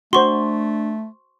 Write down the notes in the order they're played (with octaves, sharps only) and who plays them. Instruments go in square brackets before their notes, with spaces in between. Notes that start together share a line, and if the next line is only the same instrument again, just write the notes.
[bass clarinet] A3 [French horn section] D4 [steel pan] F#4 C5 [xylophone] C6 C#6